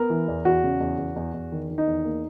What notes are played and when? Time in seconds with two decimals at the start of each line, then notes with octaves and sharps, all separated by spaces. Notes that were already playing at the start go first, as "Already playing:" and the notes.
Already playing: B3 A#4
0.10 E3
0.28 E2
0.45 E2 F#4
0.64 C#3
0.81 E2
0.98 E2
1.16 E2
1.34 E2
1.52 D#3
1.70 D#3
1.78 D#4
1.87 E2
2.04 A#3